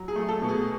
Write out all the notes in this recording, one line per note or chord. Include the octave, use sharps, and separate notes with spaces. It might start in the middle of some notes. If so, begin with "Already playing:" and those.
Already playing: F#3
G#4
A3
A4
B2
G#4